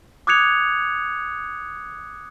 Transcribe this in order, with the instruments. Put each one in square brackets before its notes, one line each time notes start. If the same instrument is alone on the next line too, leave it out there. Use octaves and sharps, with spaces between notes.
[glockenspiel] D6 D#6 F#6 G#6 C#7 F7